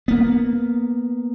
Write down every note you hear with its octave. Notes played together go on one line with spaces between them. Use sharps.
A#3 B3